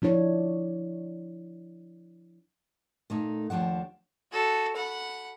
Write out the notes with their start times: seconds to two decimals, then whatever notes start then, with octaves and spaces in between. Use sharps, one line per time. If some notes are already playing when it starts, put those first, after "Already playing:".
0.02 F3 D4 E4 C#5
3.10 A#2 A3 D#4
3.50 D#2 D#3 F3 D4 F#5
4.32 F#4 A4
4.76 F#5 B5